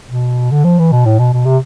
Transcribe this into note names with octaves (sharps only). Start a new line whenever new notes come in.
B2
D3
F3
E3
B2
A2
B2
B2
C3